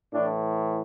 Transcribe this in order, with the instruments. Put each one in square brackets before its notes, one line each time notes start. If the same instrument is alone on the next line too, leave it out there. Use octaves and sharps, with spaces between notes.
[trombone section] A2 E3 D4